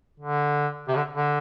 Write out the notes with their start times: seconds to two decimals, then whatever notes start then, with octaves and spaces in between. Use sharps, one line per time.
0.20 D3
0.88 C3
0.96 D3
1.13 D3